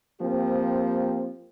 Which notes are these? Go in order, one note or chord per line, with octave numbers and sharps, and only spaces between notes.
F3 A#3 C4 G4